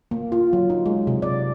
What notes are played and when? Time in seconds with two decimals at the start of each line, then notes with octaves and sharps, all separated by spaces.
0.11 A#3
0.32 F4
0.53 F#3
0.70 D#4
0.86 G#3
1.07 C3
1.22 D5